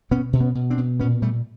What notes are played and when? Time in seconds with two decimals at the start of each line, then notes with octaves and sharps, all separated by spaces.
0.11 B2 B3 C#4
0.33 B2
0.40 B3 C#4
0.55 B2
0.70 C4 D4
0.78 B2
1.00 A#2 B3 C#4
1.22 A#2 G3 A3